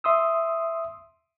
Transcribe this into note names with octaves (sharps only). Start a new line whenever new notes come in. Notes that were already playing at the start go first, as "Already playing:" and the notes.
E5 C6 D#6 E6